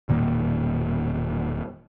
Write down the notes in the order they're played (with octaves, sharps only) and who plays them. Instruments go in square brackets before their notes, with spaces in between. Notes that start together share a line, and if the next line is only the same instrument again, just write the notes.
[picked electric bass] E1 A#2 D#3 A#3